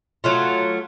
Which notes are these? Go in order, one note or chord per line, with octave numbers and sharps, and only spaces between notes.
F#3 A3 F4